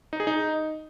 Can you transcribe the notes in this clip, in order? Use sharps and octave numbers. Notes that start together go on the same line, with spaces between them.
D#4
G#4
D#4